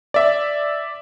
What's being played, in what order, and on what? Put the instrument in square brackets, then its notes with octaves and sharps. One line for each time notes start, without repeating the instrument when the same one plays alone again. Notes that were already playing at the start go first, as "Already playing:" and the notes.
[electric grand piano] D5 E5